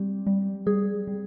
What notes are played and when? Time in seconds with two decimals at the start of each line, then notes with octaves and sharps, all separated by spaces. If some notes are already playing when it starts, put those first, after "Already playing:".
Already playing: G3 C4 G4
0.27 G3
0.67 G3 G#4
1.07 G3